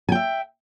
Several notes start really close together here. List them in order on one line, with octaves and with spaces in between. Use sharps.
G#5 G5 E5